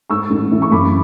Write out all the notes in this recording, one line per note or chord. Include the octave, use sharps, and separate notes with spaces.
G#2 C#6 E6
A1
E3
C#6
F#2 B5 D6